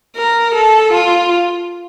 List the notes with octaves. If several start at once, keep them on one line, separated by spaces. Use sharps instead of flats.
A#4
A4
F4